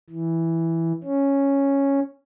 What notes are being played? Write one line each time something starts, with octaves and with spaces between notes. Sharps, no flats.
E3
C#4